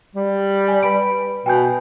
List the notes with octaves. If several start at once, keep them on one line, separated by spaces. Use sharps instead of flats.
G3
D5 G#5
B4 B5 D7
B2 G5 G#5 G6